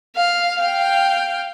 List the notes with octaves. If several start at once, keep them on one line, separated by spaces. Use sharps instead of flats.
F5
F5 G5